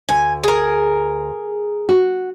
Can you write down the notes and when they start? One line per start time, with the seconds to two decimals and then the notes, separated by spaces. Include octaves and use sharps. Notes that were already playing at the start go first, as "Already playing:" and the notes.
0.09 D2 G#5
0.44 G#4 A#4
1.89 F#4